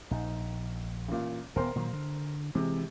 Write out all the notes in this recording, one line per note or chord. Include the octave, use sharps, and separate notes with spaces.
A#1 D#4
A1 A#2
D#1 B3 A#4 C5 C6
A#2 D#3 F#3
D3
C3 E3 G#3